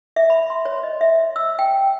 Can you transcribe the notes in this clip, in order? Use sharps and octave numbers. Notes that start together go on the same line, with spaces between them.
E5
B5
C6
C#5
D#5
E5
E6
G5